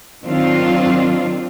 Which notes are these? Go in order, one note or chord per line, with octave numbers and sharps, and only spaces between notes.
D#3 F#3 C4 D4 F4